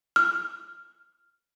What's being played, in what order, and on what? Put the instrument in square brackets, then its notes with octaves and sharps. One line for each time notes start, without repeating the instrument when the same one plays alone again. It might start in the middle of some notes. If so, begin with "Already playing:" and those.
[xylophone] F6